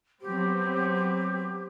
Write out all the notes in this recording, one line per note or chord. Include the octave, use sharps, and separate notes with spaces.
F#3 B3 C4 G4